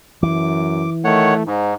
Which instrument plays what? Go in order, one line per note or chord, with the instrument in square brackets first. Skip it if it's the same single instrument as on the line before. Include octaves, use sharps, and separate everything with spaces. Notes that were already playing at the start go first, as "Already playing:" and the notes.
[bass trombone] F#2 [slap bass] E3 [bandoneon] D6
[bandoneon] D#3 C#5 F#5 [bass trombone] A3
[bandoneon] G#2 [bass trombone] D#4